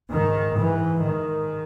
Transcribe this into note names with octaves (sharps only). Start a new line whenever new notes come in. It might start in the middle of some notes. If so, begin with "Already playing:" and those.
G#2 D#3
G#2 E3
G#2 D#3